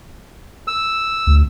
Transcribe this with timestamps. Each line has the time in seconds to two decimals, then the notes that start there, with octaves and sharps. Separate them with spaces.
0.68 E6
1.27 D2